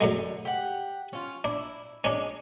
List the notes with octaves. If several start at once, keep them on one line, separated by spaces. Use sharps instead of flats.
F#2 A2 D3 G#3
G4 F#5
C#4 F4
D4 E4
G#3 C#4 D4